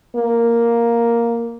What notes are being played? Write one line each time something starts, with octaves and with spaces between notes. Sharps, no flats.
A#3